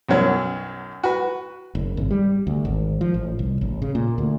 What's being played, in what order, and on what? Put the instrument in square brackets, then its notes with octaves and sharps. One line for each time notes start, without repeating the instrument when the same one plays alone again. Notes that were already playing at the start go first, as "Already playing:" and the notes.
[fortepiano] B1 F#2 F#3
F#4 B4
[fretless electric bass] F#1
G#1
G3
D2
G#1
F3
A1
C2
A1
C#3
A#2
D2